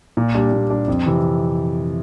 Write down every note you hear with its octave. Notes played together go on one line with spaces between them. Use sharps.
A#2
G3 D4
A#2
G3 D4
F2
C3 E3